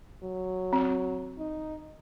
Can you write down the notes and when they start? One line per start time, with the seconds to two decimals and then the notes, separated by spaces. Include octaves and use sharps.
0.23 F#3
0.73 C4
1.39 D#4